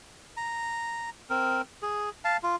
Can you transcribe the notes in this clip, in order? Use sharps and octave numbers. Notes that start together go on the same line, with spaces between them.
A#5
C4 A#4
G#4
F5 A5
F4